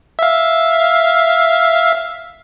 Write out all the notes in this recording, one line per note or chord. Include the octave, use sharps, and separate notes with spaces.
E5 F5